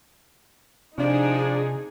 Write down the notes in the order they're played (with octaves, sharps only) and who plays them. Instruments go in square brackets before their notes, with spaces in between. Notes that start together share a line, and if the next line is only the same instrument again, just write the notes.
[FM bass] C3 [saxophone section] F3 D4 [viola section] D#4 G#4